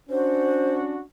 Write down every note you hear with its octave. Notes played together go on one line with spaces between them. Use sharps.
C#4 D4 F#4 C5